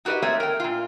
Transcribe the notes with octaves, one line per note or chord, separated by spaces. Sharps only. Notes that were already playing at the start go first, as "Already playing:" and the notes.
D#4 F#4 G4 A#4 B4 D#5
A3 A#3 C4 C#5 D#5 E5
A#4 G5
A#2 F4